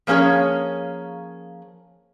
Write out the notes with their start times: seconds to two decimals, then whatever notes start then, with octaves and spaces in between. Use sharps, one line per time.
0.07 F3 A#3 C#4 G#4 C#5